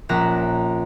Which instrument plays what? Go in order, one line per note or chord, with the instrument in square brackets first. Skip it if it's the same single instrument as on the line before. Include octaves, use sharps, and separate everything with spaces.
[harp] A#1 C#4 E5 A#5 F#6 E7